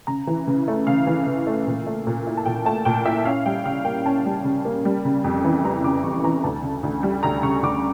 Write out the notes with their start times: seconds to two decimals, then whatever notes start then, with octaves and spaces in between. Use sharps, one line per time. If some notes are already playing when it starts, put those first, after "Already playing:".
0.07 C#3 A#5
0.27 E3
0.47 C#3
0.68 A3
0.87 C#3 F5
1.07 E3
1.26 C#3
1.47 A3
1.67 A#2
1.87 A3
2.07 A#2
2.27 E4
2.37 A5
2.45 A#2 G5
2.66 A3 A5
2.85 A#2 G5
3.06 E4 E5
3.25 C#4 F5
3.46 G3 G5
3.66 C#3 F5
3.85 A#3 G5
4.06 C#4 A5
4.26 G3
4.44 C#3
4.65 A#3
4.85 G3
5.05 C#3
5.24 F2
5.45 E3
5.64 G3 A#5
5.84 C#3 D6
6.04 F2 C#6
6.24 E3 A#5
6.44 D2 A5
6.63 C#3
6.83 D2
7.03 G3
7.23 D2 A#5
7.43 C#3 C#6
7.63 D2 D6